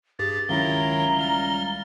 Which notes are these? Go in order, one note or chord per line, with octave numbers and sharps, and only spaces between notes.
G2 G4 G#4 A6
C#2 D#3 F#3 E4 E5 F5 A#5 G7
G3 F6 A6